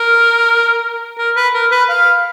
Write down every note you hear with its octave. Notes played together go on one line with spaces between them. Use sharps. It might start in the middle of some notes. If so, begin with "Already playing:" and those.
Already playing: A#4
A#4
B4
A#4
B4
F5